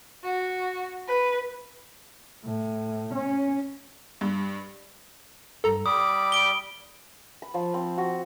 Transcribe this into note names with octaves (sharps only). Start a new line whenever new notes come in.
F#4
B4
A2
C#4
G2
G2 A4 A#5
G3 B5 D6 D#6
D7 G7
B5
F3
C4
F#4